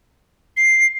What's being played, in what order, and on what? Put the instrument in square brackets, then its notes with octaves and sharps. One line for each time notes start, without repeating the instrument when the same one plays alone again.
[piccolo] C7